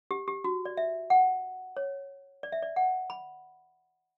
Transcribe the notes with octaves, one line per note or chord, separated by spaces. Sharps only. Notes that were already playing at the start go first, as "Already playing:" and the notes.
G4
G4
F#4
D5
E5
F#5
C#5
D5
E5
D5
F#5
B5